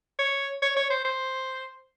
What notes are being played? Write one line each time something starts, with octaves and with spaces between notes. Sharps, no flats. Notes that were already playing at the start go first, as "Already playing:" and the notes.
C#5
C#5
C#5
C5
C5